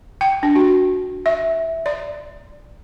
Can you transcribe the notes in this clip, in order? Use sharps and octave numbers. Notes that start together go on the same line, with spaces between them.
G5
D4
F#4
E5
D5